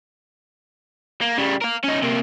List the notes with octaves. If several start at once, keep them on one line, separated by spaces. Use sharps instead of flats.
A#3
C#3 G3
A#4 F5
C#4 D#4
C3 A#3